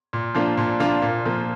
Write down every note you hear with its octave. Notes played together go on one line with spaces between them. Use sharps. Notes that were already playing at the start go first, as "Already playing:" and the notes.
A#2
F3 A#3 D4 F4
A#2
F3 A#3 D4 F4
A#2
F3 A#3